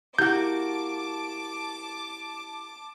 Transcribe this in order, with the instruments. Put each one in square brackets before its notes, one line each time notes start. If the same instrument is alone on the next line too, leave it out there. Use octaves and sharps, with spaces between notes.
[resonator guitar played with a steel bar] A#3 F#4 [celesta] E4 G4 [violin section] A5 D6 [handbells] G6